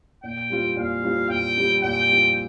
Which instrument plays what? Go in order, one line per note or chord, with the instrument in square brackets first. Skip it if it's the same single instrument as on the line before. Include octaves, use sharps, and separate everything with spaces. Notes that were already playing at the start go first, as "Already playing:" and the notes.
[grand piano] A#2 [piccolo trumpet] G5
[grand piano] G3 C4 F4
[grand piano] A#2 [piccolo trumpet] F5
[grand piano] G3 C4 F4
[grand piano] A#2 [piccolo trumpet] G5
[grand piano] G3 C4 F4
[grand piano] A#2 [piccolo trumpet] G5
[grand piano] G3 C4 F4